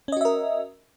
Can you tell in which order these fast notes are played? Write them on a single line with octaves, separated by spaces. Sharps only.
C#4 D#5 F#4 E5 A#4